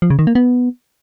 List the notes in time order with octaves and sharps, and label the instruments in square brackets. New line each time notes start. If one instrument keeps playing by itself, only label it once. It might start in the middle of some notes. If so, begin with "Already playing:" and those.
[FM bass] F3
C#3
D#3
A#3
B3